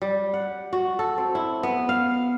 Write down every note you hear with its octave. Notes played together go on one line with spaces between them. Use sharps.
G3
F#5
F#4
A4
C4
E4
B3
F5